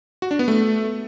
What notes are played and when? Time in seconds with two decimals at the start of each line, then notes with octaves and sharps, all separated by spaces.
0.22 F#4
0.31 D4
0.39 B3
0.48 A3